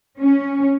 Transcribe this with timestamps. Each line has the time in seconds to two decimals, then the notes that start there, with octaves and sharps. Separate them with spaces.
0.19 C#4